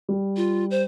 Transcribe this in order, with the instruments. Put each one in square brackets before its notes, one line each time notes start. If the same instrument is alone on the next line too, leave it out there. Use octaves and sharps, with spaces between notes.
[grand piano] G3
[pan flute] F4
C5